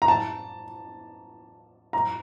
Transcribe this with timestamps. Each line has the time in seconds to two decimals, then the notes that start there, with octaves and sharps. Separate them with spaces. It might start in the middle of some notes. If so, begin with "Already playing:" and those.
0.02 A#5
0.08 A5
1.93 A#5